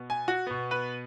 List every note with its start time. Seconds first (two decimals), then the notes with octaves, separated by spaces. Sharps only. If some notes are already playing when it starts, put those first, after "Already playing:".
Already playing: B2 B3
0.10 G#5
0.28 F#4
0.47 B2 B3
0.71 B4